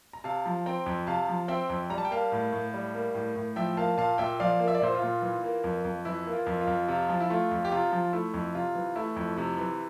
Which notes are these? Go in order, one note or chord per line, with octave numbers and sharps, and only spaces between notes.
A#5
C3 F5 A5
F3
C4 G5 A#5
F2
C3 F5 A5
F3
C4 E5 G5
F2
G3 A#5
A5
G5
A#3 F5 A5
A2
A2
G3
A#3
A2
A2
F3 E5 G5
A#3 F5 A5
A#2 F5 A5
A#2 E5 G5
F3 D5 F5
A#3
E5
D5
A#2 C5 E5
F4
A#2
E3
A#3
F2
F2
E3 E4
A#3
F4
F2
F4
F2
C3 F4
F3
E4
A3 F4
F2
G4
C3 F4
F3
A3 E4
F2
C3 F4
E3
A3 E4
F2
C3
E3